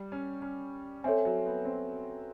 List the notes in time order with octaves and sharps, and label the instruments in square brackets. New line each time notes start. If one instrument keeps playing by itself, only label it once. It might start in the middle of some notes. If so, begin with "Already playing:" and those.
Already playing: [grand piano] G3
C#4
C#4
[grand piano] C4 [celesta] A4 C#5 E5 G#5
[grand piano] F#3
B3
C4